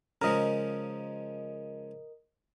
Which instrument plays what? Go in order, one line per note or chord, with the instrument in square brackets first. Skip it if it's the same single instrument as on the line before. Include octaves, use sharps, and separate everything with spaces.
[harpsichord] C#3 F3 G#3 [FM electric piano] A#4 D#5